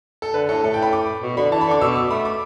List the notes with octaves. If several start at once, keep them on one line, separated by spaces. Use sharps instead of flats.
A4
D3 B4
A2 A4
A2 A4
G5
B5
D6
B2
D3 B5
E3 A5
B5
D3 D6
B2 E6
D6
A3 B5
D6